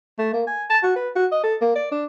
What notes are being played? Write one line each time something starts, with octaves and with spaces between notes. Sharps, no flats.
A3
A#3
G#5
A5
F#4
B4
F#4
D#5
A4
A#3
D5
D4